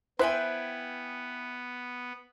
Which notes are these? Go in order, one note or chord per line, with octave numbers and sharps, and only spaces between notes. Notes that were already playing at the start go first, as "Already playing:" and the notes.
B3 E4 B4 C5 E5 G5 G#5